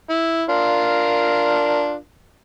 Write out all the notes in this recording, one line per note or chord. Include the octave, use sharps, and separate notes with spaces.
E4
D4 F4 A#4